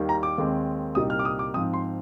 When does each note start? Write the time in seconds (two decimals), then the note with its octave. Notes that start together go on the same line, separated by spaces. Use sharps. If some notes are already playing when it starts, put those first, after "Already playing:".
Already playing: D#2 D#3 G3
0.09 A#5
0.23 D6
0.38 D#2 D#3 G#3 C4
0.95 C2 A#2 G3 C4 D#4 D#6
1.10 F6
1.19 D6
1.25 D#6
1.39 D6
1.54 G#2 F3 C4 D#6
1.74 C6